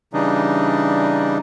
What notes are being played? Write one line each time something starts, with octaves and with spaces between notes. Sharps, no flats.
C#3 E3 G3 D4 D#4